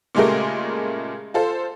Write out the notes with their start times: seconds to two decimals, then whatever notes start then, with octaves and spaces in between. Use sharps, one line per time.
0.15 A#2 C#3 G#3 A3 G4 A#4
1.34 F4 A4 C5